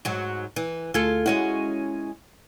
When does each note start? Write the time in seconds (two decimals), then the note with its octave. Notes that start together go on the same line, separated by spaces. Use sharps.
0.05 G#2 F#3
0.56 E3
0.94 D2 A3 F4 G#4 A4 G#6
1.26 G#3 C#4 E4 F#4